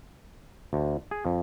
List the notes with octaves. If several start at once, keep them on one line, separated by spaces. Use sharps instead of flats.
D2
G#4
F2